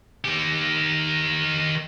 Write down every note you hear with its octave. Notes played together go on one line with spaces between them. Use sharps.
D#3 G4